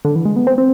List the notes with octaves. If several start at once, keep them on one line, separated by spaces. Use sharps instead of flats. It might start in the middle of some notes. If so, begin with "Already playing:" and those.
D3
E3
G#3
B3
C4
C4